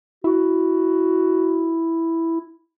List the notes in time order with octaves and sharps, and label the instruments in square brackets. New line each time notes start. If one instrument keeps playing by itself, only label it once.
[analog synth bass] E4 [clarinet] F#4